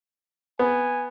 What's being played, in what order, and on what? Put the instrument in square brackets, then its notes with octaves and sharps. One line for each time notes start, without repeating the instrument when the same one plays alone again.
[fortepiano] B3 [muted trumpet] G#5